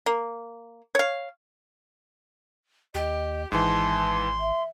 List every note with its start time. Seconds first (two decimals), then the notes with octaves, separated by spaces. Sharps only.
0.06 A#3
0.95 C#5 F5
2.94 D#2 G4 D#5
3.52 G#1 G#2 E3 A5 C6
4.39 E5